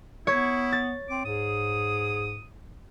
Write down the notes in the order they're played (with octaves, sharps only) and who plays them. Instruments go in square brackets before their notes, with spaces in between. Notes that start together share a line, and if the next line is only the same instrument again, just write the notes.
[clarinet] B3 [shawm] E4 [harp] C#5
[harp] A6
[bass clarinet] C4 [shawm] D6
[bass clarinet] G#2 [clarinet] G#4 [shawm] D#6